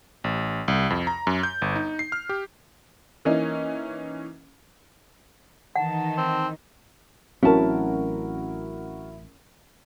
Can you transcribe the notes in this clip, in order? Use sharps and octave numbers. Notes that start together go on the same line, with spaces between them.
A1
C2
F2
A#5
F#2
G6
G1
D#4
C7
F6
G4
E3 A#3 C#4 D#4
D#3 E3 D#4 F#5 A5
C4
A1 F#3 C4 C#4 E4 F#4 A#4 A5